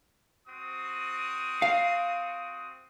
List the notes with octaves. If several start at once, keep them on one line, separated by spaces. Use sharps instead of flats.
C4 F#4 D#6
F5